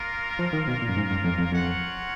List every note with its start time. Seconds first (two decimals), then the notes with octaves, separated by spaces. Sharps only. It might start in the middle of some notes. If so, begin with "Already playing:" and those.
Already playing: A#3 F4 A#4
0.39 F3
0.53 D#3
0.68 B2
0.82 A#2
0.89 F#2
0.97 G#2
1.10 F#2
1.24 F2
1.38 F2
1.53 F2 F4 A#4 C#5 F#5